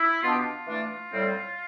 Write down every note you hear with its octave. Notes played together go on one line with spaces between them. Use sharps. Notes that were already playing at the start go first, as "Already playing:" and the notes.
Already playing: E4
B2 B3 D4 F4
G4
F4
E3 A3 D4
A2 G3 C4